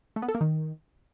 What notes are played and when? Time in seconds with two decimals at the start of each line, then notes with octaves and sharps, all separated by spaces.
0.16 A3
0.22 B3
0.28 A4
0.35 A#3
0.41 D#3